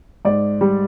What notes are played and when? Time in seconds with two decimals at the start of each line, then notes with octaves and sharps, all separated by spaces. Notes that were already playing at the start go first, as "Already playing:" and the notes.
0.25 G#2 D5
0.61 G3